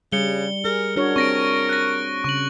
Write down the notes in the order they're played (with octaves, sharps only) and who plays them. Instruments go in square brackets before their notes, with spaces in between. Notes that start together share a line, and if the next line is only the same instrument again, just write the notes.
[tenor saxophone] C#3 [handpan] G3 [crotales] C#7 G7
[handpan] G#4 [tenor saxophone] A#4
[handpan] D4 F#4 C#5 [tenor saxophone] A#4
[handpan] C4 [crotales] C#6 A#6 D7
[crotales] F#6 A#6
[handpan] C#3 [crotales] C#6 F#7